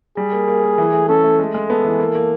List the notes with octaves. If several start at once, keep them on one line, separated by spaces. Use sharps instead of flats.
G3 G#4
A#3
A#3
A#3
E3
A3
C#4 A4
A3
G#3
G#3
B3 A4
E3
A#3
A#3